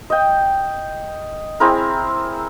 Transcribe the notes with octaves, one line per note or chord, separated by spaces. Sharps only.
D#5 G5
C4 E4 G#4 A#4